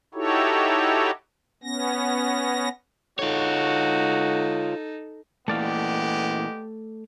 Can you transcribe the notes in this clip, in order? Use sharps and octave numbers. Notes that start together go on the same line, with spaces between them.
D#4 E4 F#4 G4 A4 C#5
B3 C#4 A#6
D#4 F4 F#4 A4 C#5
A#2 E3 G#3 A3 B3 G4 D5 F5